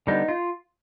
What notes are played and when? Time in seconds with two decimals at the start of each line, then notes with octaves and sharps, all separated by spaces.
0.07 D3 G3 B3 D#4
0.29 F4